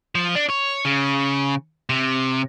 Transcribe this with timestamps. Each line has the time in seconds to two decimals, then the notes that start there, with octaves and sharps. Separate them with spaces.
0.15 F3
0.35 D4
0.49 C#5
0.85 C#3
1.89 C3